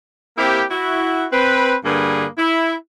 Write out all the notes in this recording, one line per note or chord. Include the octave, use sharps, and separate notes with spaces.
A#3 C4 E4 G4
E4 F#4
C4 B4
G2 D3 A#3 G#4 B4
E4